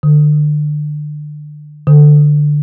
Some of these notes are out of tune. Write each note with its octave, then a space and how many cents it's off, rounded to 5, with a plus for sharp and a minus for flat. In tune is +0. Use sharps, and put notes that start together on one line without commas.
D3 +30
D3 +10